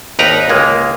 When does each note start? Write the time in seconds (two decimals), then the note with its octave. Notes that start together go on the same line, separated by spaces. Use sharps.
0.19 G#1 D#2 D#4 A#4 B4 A#5
0.49 C#2 G#3 A#3